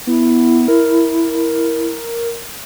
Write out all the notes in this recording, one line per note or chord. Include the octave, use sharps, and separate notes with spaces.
B3 E4
A#4